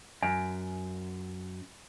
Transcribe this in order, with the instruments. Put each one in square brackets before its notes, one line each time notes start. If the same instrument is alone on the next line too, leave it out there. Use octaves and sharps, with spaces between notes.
[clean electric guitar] F#2 [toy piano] G#5